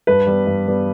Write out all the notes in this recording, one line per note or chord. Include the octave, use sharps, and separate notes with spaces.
G2 B4
G3 B3
G2
G3 B3